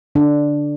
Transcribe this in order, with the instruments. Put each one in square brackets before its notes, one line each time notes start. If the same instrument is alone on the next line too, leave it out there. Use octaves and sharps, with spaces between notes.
[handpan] D3 D4